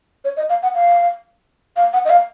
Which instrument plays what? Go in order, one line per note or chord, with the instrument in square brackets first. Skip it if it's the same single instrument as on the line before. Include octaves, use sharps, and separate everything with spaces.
[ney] C#5
D#5
F5
F#5
F5
F5
F#5
D#5
F5